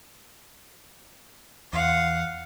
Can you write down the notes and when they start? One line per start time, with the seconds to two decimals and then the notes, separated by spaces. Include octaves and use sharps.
1.73 E2 F5 F#5